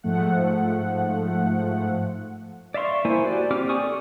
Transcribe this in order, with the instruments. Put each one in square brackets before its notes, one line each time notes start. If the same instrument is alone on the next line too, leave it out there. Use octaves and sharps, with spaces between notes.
[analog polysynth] G#2 F3 A3 F#5
[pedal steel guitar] D5 E5 F5 C6 C#6
A#3 B3 E4 C5 G#5
F#4 G4 C5 D5
C4 G4 D6 F6
G4 D5 G#5 C#6 D#6
A4